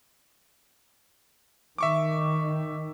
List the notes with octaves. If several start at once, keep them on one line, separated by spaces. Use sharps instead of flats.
D#3 E5 C#6 D6